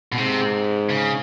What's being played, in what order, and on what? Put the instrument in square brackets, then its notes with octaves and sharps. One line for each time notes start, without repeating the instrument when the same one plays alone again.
[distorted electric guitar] B2
[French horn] G#2 [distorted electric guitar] C3
[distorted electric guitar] C#3